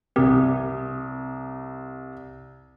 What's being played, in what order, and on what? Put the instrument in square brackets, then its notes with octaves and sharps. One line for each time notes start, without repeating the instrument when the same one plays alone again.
[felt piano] C2 D#6 [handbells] C4 G4 A#4